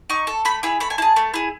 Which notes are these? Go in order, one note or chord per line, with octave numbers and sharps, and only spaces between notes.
D#4 C#6
A4
A3 B5
E4 G#4 B5
A3 B5
G#5
E4 G#4 A5
A3
E4 G#4